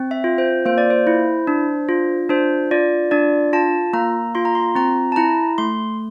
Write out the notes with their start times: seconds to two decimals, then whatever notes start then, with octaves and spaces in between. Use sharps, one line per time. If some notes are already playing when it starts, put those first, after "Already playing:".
Already playing: C4
0.11 E5
0.24 F4
0.38 C5
0.65 A#3 C5
0.78 D5
0.90 C5
1.07 E4
1.47 D4
1.89 F4
2.29 D4 C5
2.71 F4 D5
3.11 D4 D5
3.53 F4 A5
3.93 A#3 A#5
4.35 F4 C6
4.45 A#5
4.55 C6
4.75 C4 A#5
5.12 A5
5.16 E4 A#5
5.58 A3 C6